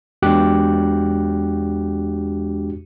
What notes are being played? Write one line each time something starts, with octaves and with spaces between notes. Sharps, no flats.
E2 G#3 D4 F#4 G4 F#6